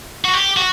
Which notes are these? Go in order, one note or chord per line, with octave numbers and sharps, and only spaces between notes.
F#4
G4
F#4